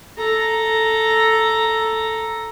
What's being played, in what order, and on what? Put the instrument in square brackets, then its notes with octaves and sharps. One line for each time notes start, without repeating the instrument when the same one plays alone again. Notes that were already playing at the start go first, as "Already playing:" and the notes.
[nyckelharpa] A4 A#5